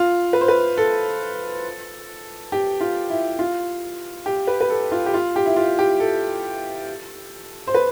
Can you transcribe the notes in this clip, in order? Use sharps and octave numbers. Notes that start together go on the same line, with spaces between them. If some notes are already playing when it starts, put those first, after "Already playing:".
Already playing: F4
B4
C5
B4
A4
G4
F4
E4
F4
G4
B4
B4
A4
F4
G4
F4
G4
E4
F4
G4
A4
C5
B4